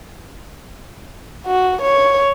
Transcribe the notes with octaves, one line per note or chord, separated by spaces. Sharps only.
F#4
C#5